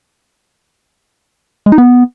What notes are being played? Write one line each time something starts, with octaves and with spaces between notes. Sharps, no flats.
G#3
D#4
B3